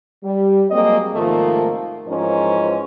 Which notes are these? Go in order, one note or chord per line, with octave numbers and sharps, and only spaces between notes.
G3
F#3 G#3 A#3 C4 D#5
G#2 C3 D#3 F3 A3 A#3
G#2 E3 F3 C#4 A#4 D#5